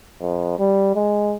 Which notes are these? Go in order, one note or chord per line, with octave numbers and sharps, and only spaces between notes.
F2
G3
G#3